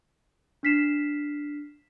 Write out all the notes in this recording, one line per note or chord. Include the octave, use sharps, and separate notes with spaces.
D4 F6 B6 C7 E7